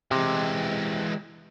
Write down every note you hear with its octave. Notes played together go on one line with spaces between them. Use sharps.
C3 E3 G#3